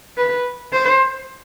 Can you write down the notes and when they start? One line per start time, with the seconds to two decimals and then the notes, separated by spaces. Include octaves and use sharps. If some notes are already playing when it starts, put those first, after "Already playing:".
0.17 B4
0.73 C5